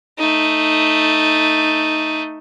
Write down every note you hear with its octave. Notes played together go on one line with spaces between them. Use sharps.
A3 D#4